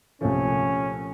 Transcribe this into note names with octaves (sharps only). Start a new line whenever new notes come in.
C2 A#2 F3 A3 C#4